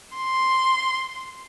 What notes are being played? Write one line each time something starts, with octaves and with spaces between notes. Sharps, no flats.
C6